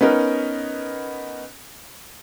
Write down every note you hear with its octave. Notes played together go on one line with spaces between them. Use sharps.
B3 C#4 D#4 A#4